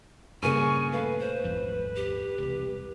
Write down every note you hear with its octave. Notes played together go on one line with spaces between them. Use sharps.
G2 A#2 C#3 A#3 G#5 C#6
A3 B4 F5
C5
D#1 G#1 F2
G4
E1 C2